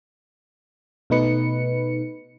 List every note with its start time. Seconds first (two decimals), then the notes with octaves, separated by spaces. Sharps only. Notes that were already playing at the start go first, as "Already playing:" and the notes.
1.10 B2 A3 D#4 B4 C#7